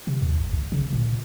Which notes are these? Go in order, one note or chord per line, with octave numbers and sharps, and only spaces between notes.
C3
D#2
G#1
C#2
C#3
A#2